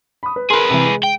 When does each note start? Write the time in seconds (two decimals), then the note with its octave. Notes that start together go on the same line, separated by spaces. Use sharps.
0.23 B5 D#6
0.36 B4
0.50 G#4 A#4 B4 C6
0.70 C3 E3
0.86 G#3
1.03 G5